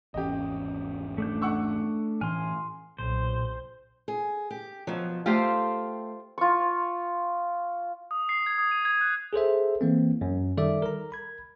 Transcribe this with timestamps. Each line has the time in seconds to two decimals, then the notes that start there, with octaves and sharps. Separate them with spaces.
0.14 G#1 E2 C#4 G4 D#5
1.18 A3 D4 G6
1.42 F#5 C#6 E6
2.21 A2 E3 G#5 C6 F6
2.98 B1 A#2 C5
4.08 G#4
4.51 G4
4.87 B2 F3 F#3
5.26 A3 F4 G4 C5 F5 G5
6.38 F4 C#6
8.11 D#6
8.29 C7
8.46 G#6
8.58 D#6
8.71 D#7
8.85 G#6
9.01 F#6
9.33 G#4 A4 C5 E5
9.81 E3 A#3 C4
10.21 F#2
10.57 D#3 G3 A4 D5 E5 D6
10.82 A#4 A#5
11.12 B5 G#6